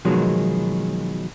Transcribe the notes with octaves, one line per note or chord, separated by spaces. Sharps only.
B2 D#3 F3 F#3 G#3